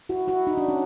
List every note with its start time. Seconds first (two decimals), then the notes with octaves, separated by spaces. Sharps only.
0.09 E4 F#4
0.28 E4 F#4
0.47 D#4
0.57 D4
0.68 C#4